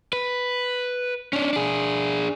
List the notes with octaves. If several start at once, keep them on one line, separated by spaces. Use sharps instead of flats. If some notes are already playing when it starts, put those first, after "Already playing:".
B4
C#4 D4
D4 G#4